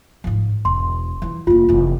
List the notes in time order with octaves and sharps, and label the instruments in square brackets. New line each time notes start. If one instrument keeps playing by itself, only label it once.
[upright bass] G#2 F3
[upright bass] E1 [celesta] C6
[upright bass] E3 F3
[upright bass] F1 A#3 [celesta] F4
[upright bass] F1 E3